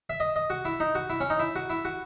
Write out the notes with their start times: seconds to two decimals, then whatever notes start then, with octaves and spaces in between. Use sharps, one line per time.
0.10 E5
0.20 D#5
0.36 D#5
0.50 F#4
0.65 E4
0.80 D#4
0.95 F#4
1.10 E4
1.20 C#4
1.30 D#4
1.40 E4
1.56 F#4
1.70 E4
1.85 F#4